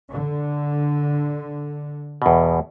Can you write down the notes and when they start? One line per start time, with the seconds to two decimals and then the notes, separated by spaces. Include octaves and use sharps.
0.10 D3
2.22 E2 B2